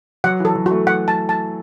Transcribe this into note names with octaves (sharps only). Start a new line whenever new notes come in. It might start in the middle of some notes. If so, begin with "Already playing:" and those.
F#3 F#5
E3 A4
F#3
F#4
A3
F#5
A5
A5